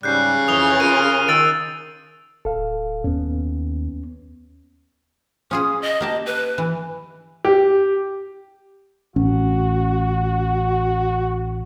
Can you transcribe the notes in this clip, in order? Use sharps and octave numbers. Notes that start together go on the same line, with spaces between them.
G#2 C#3 G3 F#6 G6 C7
F2 E3 D#6 F7 G7
F4 A#4 D#7
D#3 E6 A6 D7
D1 A4 F5
D#2 B3 C#4
C#4 F4 G#4 D#6
D#5
A#3 G4 A5
B4
E3
G4
A1 C#4 F#4